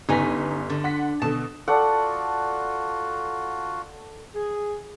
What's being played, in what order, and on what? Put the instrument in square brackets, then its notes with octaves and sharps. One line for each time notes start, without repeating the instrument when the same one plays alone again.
[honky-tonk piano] G1 B3 B6 [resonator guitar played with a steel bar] C#3 D#4 G#5
[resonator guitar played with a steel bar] D3
[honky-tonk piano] F#5 C6 B6
[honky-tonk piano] B2 D3 [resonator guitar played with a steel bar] A5
[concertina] F4 F#4 [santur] A4 D5 F#5
[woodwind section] G#4